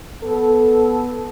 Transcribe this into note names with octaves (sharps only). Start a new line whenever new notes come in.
B3 A4